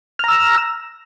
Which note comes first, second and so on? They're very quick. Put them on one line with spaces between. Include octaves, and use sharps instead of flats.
F6 A#5 E6